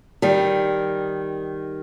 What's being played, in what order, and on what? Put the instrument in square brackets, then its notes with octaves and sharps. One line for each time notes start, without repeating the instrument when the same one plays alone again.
[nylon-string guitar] D#3 G3